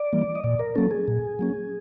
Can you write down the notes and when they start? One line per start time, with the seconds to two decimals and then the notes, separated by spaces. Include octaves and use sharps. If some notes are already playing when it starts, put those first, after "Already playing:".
Already playing: D5
0.13 E3 G3 A#3
0.35 D#5
0.44 A#2 D5
0.59 A#4
0.75 F#3 A#3 C#4 A4
0.91 G#4
1.08 A#2
1.39 F#3 A#3 C#4